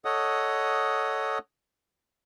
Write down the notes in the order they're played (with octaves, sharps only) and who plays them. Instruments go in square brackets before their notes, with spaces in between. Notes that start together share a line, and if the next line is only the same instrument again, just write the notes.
[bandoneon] A4 C#5 D#5 F#5 D#6